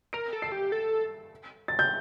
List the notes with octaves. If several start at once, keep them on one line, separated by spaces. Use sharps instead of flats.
A#4 D7
A4
C7
G4
A4
A6
G6